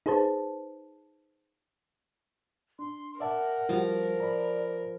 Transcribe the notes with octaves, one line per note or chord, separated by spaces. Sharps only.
D#4 G#4 B4 C5 A5
D4 C6
A#4 D5 E5 F#5 A5
F3 G3 F#4
D5 A#5 B5